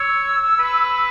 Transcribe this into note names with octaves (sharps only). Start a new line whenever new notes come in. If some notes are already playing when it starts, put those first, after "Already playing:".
Already playing: C#5 E6
B4